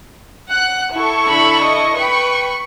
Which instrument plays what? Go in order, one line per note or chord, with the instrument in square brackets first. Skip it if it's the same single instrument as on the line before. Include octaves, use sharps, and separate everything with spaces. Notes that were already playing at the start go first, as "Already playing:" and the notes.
[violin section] F#5 F#6
E4 A4 C#6
[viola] D3 B5
D#5
[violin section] B4 G5 B5 [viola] C#6